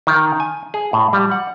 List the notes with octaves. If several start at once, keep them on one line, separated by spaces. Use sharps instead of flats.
D#3
G#5
G#4
A2
G3
F#5